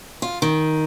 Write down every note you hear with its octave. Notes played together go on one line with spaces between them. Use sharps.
F4
D#3